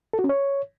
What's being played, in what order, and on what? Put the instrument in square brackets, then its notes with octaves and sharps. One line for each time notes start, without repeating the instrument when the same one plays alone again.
[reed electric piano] A4
F#4
C#4
C#5